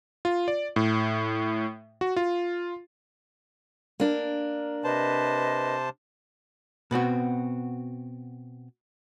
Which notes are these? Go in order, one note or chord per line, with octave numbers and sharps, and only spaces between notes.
F4
D5
A2
F#4
F4
A#3 D4 A#4
C3 B4 C5 D#5 A5
B2 B3 C4 F#4